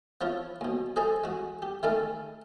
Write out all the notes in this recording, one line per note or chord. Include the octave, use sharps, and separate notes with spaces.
F3 E4 F4 C#5
D#2 B2
G#4 A4 C5 D#5 G#5 A#5
G#3 F#4
G4
D#3 G#3 A3 D#4 A4 A#4